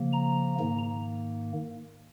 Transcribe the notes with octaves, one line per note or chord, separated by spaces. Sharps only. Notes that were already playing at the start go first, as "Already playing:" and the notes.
Already playing: C#3 F3 A#3
A#5
G#2 D#3 A#3